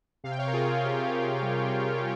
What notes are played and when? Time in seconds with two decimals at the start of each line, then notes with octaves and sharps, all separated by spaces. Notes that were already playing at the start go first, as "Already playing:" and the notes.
0.24 C3 F5
0.31 G5
0.38 C#5 F5
0.47 A#4
0.53 C3 F4 G#4
0.83 C3 G4
0.93 G#4
1.04 G4
1.13 C3
1.42 G3
1.71 C3